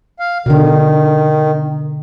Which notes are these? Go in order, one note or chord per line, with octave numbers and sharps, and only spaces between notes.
F5
B2 D3 D#3